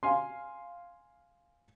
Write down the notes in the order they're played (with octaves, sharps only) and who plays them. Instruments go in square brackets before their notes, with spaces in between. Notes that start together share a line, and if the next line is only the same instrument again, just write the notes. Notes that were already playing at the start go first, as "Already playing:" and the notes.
[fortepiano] F5 G#5 C6